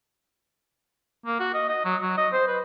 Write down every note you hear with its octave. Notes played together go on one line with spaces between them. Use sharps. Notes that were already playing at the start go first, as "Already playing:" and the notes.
A#3
F#4
D#5
D#5
F#3
F#3
D#5
C5
B4